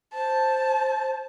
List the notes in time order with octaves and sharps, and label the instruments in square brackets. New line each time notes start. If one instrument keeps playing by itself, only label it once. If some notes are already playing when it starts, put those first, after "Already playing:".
[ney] C5 [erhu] A5